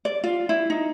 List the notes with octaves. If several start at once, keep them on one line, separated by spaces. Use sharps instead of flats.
D5
F4
E4
D#4